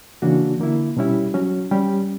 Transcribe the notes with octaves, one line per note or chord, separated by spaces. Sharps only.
C#3 E3 A#3 D4 F#4
D3 A#3 E4
B2 G3 C#4 E4 G4
F#3 C#4 F#4
G3 C#4 G4